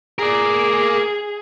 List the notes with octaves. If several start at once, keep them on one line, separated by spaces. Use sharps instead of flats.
G#4 A#4 D5